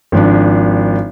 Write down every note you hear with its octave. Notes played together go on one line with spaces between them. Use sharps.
G#1 F3 D4